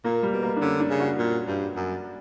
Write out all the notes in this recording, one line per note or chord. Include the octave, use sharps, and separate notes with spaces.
A#2 A#3
G3
B2
A#3
D4
D3 C#4
D4
C#3
F#4
A#2
G2
F#2